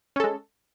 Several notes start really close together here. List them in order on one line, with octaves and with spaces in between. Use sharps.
C#4 A4 G#3